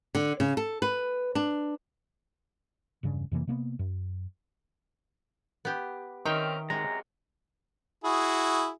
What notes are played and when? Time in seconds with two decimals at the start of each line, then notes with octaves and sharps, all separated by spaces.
0.15 D3
0.40 C#3
0.57 A4
0.82 B4
1.35 D4
3.03 E1 G2 C#3
3.31 F2 C3 E3 A#3
3.47 C3 A#3 B3
3.79 F#2
5.65 B3 G4
6.25 D#3 C4 C#4 D#4 A#4 E5 G5
6.70 F#2 C3 G#3 A#5
8.04 E4 F#4 G#4